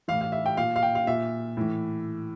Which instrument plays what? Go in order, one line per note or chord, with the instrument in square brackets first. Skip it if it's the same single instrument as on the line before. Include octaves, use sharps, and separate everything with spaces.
[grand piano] A2 E3 F5
F5
E5
G5
A#2 F5
F5
G5
F5
A#2 E5
A2 E3